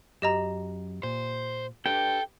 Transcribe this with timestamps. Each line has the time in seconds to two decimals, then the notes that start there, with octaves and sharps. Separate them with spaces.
0.22 F#2 G4 D#5 A#5
1.03 A#2 C5
1.86 D4 G4 A4 B4 G5